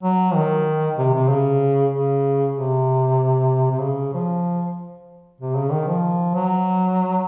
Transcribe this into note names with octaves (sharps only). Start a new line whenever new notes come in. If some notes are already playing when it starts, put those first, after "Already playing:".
F#3
D#3
C3
C3
C#3
C#3
C3
C3
C#3
F3
C3
C#3
D#3
F3
F#3